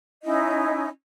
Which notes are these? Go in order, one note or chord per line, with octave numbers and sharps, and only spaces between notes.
C#4 D#4 E4 D#5